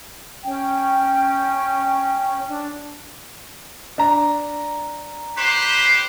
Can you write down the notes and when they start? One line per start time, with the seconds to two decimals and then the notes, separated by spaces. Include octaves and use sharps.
0.44 C#4 G5
2.48 D4
3.98 D4 A#5
5.36 G4 B4 C5